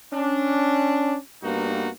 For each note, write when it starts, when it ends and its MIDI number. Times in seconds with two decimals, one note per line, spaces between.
0.13 1.16 61
0.13 1.16 62
1.43 1.89 43
1.43 1.89 58
1.43 1.89 59
1.43 1.89 63
1.43 1.89 66